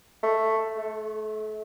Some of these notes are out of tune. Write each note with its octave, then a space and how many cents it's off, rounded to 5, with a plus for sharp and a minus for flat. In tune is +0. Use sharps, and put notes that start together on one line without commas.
A3 +5
A3 -35